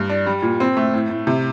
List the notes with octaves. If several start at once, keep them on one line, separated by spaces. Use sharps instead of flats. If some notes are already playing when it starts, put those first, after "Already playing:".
Already playing: G2
D4
G3
A#2
C4
A3
A2
A2
C3